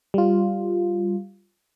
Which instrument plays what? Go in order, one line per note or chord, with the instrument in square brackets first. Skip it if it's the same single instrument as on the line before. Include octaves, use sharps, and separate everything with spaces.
[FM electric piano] G3 F4